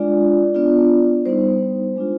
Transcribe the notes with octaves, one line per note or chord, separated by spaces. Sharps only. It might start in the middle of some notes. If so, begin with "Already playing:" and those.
Already playing: G#3 D4 F4 D5
B3 D4 F4
G3 B3 D#4 C5
G#3 D4 F4